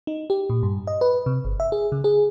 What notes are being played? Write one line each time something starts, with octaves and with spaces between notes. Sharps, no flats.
D#4
G4
A#2
G2
D#5
B4
C3
G1
E5
G#4
C#3
G#4